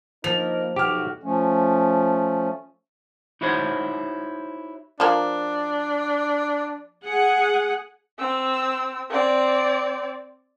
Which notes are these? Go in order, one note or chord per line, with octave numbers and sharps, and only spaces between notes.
F3 A#3 D#4 A#4 F7
B1 F#4 G4 D6 F6
F3 A3 C#4
D#4 E4 F#4 C5 C#5
F3 A#3 D4
G#4 F#5
C4 E6
C4 D5